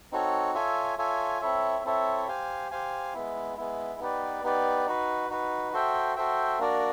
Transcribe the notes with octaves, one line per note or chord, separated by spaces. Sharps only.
C4 D#4 F#4 A4 C#5
F4 A4 C#5 E5 G#5
F4 A4 C#5 E5 G#5
C4 E4 A4 C#5 E5
C4 E4 A4 C#5 E5
G4 C5 F5 G#5
G4 C5 F5 G#5
G#3 B3 E4
G#3 B3 E4
B3 D#4 G4 B4 D5
B3 D#4 G4 B4 D5
D#4 F#4 B4
D#4 F#4 B4
F#4 A4 C5 E5 G5
F#4 A4 C5 E5 G5
A#3 D4 F#4 A#4 D5